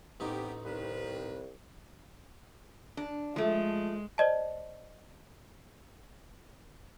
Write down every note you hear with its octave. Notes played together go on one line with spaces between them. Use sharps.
A1 B3 C4 D#4 G4
C2 D#3 C4 B4
D4
F3 G#3 A3
C5 D5 D#5 A5